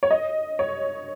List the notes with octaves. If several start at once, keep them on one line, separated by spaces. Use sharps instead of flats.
C#5
D#5
C#5